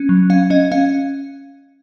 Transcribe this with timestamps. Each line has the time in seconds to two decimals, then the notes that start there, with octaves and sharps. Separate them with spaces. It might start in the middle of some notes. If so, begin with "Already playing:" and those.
Already playing: C#4
0.09 F#3
0.30 C#4 F5
0.50 C#4 D#5
0.72 C#4 F5